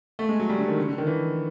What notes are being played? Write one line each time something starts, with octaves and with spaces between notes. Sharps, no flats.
A3
G#3
F#3
G3
D3
D#3
D3
D3
D#3
E3